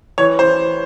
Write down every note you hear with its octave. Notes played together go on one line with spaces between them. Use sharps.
E3 C#5
E3 C5